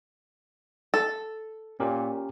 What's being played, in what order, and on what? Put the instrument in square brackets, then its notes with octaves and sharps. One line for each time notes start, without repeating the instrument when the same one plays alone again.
[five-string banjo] A4
[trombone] A#2 [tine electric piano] C#4 G4 A#4